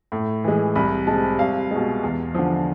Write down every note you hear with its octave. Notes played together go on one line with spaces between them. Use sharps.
A2
E3 G#3
C2 B5
C3 G#3 A5
C2 F5
B2 G#3
E2
D3 F3